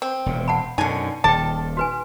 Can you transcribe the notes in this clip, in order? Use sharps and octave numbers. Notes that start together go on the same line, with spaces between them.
C4
E1 A#2
F#5 A5 B5
F#2 B2 D3 D#4 G#5
D#1 D#3 G#4 G5 A5
F#4 B4 G#5